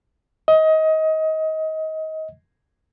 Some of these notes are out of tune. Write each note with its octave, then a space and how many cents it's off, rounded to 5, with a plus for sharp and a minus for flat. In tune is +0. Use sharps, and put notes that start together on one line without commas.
D#5 +25